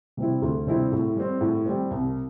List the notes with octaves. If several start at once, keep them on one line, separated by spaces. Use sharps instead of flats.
C3 G3 C4 E4
D2
C3 G3 C4 E4
A2
G3 C4
A2
G3 C4
C2